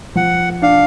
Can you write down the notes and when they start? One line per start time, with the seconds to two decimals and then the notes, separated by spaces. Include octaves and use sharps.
0.15 F3 F#5
0.62 D4 F5